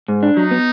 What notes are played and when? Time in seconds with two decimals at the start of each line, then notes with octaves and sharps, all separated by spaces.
0.08 G#2
0.23 D4
0.37 F#3 D#4
0.51 B3